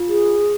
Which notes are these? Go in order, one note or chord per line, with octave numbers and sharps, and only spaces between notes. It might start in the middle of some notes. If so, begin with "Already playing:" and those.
Already playing: F4
G#4